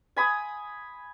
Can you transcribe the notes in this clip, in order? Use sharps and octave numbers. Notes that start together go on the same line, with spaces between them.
G#5 B5 D#6